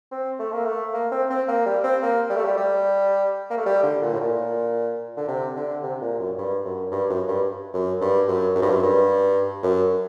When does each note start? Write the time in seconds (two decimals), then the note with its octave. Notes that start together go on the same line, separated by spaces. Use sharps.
0.12 C4
0.39 A3
0.53 A#3
0.65 A3
0.94 A#3
1.11 C4
1.30 C4
1.48 A#3
1.66 G3
1.84 C4
2.03 A#3
2.30 G3
2.37 A3
2.44 G3
2.57 G3
3.50 A#3
3.57 A3
3.66 G3
3.83 D3
4.02 A#2
4.13 A2
4.20 A#2
5.17 D3
5.28 C3
5.56 D3
5.83 C3
6.01 A#2
6.19 F#2
6.38 G2
6.65 F#2
6.92 G2
7.09 F#2
7.28 G2
7.73 F#2
8.01 G2
8.28 F#2
8.55 F#2
8.62 G2
8.70 F#2
8.83 G2
9.63 F#2